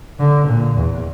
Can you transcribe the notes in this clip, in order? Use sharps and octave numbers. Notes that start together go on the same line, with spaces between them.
D3
A#2
E2